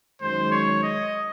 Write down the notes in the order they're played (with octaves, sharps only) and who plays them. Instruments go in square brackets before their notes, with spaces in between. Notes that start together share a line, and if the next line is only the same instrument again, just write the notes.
[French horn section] F#2 D#3 G#3 [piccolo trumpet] C5
[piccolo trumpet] C#5
D#5